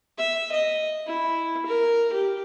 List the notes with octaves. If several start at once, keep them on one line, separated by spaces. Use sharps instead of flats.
E5
D#5
E4
A#4
G4